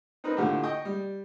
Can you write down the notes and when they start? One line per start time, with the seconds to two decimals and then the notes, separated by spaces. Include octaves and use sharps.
0.24 C4 D#4 A#4 B4
0.37 A2 D3 A3 D4 F4 G4
0.63 D#5 G5 C#6 D#6
0.85 G3